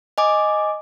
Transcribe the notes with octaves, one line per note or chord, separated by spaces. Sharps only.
D#5 G#5 D6